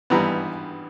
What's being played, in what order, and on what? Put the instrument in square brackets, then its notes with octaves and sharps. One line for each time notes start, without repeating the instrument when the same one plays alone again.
[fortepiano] G#1 G2 E3 G3 B3 A#5